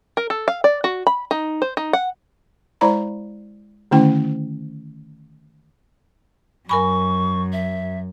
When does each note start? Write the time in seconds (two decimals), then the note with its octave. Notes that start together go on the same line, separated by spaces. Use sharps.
0.17 A#4
0.30 A4
0.48 F5
0.64 D5
0.84 F#4
1.07 B5
1.31 D#4
1.62 C5
1.77 D#4
1.93 F#5
2.81 G#3 E4 C5 D5 A#5 B5
3.91 D3 D#3 A3 C#4 E4 G5
6.69 F#2 A#4 G#5 B5 C#6
7.53 E5